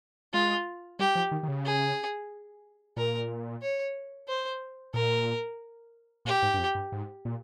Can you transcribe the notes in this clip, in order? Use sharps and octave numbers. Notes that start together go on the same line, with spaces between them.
G#3 F4
G3 G4
F3
D#3
D#3
C#3
G#4
A#2 A#4
C#5
C5
A#2 A#4
A#2 G4
G#2
G2
F2
G2
G#2
A#2